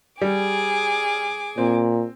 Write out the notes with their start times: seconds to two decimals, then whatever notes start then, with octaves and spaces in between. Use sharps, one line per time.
0.22 G3 G#4 D6
1.58 A#2 C4